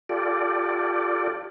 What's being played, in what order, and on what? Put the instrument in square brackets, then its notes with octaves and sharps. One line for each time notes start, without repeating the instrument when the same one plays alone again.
[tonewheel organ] F4 G4 A4 D5